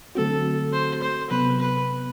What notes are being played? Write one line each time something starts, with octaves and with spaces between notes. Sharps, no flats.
D3 F#3 A3 C4 F#4 A4
C5
C5
C3 F#3 B3 B4
B4